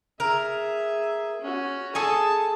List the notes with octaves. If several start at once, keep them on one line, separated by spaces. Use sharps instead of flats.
G#4 A#4 E5
C#4 F#4
G#4 A4 G#5 A5